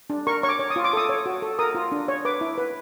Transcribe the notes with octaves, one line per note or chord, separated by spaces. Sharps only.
D4
A#4 C#6
C#5 C#6
D6
C#5
D#6
F4
D6
A4 D#6
C#5
F#4
A4
A#4 D#6
F4
D4
C#5
B4 D6
E4
B4